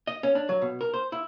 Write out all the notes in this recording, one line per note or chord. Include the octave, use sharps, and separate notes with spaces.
D#5
C#4
D4
F#3
B2
A#4
C5
E4